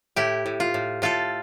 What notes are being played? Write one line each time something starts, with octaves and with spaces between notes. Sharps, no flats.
A2 E4 G4
A2
F4
A2
A2 F4 A4